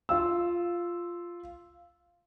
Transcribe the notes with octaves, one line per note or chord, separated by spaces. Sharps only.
F4 F5 E6